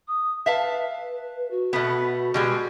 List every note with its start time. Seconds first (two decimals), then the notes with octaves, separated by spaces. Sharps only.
0.08 D#6
0.46 B4 E5 F5 A5
1.51 F#4
1.73 B2 A3 B3
2.34 B2 G3 G#3